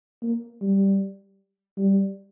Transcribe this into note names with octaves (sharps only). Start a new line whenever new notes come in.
A#3
G3
G3